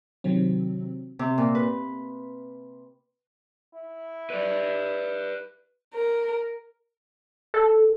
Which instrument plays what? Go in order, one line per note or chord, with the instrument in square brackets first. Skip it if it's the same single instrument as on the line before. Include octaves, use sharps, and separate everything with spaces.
[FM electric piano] C3 D#3 F#3 C4
[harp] C3
A#2
B4
[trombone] E4
[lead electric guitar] B4 D5
[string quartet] A#4
[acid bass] A4